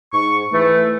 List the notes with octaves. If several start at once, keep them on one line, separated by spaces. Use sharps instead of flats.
G#2 C#6
E3 A3